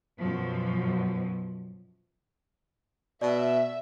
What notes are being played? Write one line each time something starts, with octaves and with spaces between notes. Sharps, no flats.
F#2 B2 F3
B2 D5 E5